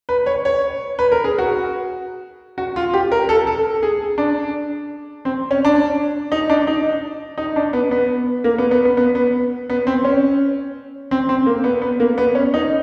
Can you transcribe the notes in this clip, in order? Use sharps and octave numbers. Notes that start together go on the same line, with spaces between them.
B4
C#5
C#5
B4
A#4
G#4
F#4
F#4
F4
G4
A#4
A4
A4
G#4
D4
C4
C#4
D4
D#4
D4
D#4
D#4
D4
B3
B3
A#3
B3
B3
B3
B3
B3
B3
C4
C#4
C4
C4
A#3
B3
B3
A#3
B3
C#4
D#4